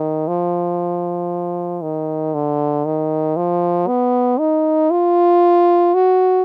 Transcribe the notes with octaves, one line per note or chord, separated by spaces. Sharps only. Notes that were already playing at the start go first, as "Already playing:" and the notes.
Already playing: D#3
F3
D#3
D3
D#3
F3
B3
D#4
F4
F#4